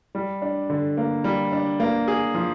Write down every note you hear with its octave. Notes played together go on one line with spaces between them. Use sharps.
G3
D4
D3
A#3
G3
D4
A#3
G#4
F3